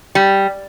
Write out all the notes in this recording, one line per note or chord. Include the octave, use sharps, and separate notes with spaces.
G3